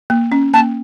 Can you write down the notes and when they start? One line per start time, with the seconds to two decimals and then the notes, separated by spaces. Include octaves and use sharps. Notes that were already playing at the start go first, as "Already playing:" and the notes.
0.10 A#3
0.32 C#4
0.53 A#3 A5